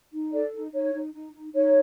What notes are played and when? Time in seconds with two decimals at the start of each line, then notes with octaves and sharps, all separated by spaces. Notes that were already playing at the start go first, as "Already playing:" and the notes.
0.12 D#4
0.33 A4 D5
0.53 D#4
0.73 D#4 C#5
0.93 D#4
1.13 D#4
1.34 D#4
1.53 D#4 C#5